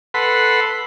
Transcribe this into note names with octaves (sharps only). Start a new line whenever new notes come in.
A4 B4 F#5 B5 C6